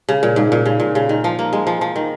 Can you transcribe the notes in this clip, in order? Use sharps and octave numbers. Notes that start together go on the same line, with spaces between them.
C#3
A#2
G#2
A#2
C#3
A#2
C#3
D#3
F3
A#3
G#3
F3
F3
D#3